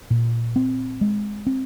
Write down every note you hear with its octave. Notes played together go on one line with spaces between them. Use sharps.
A#2
C4
G#3
C4